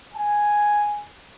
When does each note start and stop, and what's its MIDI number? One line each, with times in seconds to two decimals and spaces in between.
0.13 1.05 80